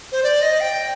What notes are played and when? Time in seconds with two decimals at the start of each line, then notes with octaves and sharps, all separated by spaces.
0.12 C5
0.23 D5
0.42 D#5
0.60 G5